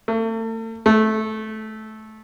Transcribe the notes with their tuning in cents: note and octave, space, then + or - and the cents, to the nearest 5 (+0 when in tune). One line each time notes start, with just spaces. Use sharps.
A3 +40
A3 -15